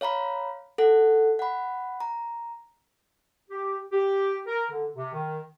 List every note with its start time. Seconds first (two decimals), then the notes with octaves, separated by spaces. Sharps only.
0.01 C#5 F5 A#5 B5
0.78 A4 F#5
1.39 F#5 B5
2.00 A#5
3.50 G4
3.91 G4
4.47 A#4
4.69 D3
4.96 C3
5.13 D#3